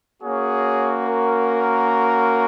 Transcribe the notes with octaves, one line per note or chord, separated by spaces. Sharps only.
A#3 C#4 F#4 G#4 C#5
A#4